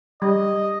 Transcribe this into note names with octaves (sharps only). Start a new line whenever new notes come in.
G3 D#5